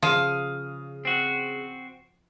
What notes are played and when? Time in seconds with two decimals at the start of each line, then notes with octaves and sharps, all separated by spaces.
0.02 C#3 F3 F5 D#6 D#7
1.05 C4 F#4